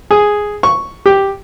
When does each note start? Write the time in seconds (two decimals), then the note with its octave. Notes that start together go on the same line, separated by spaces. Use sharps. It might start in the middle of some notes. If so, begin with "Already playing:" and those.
0.11 G#4
0.63 C#6
1.06 G4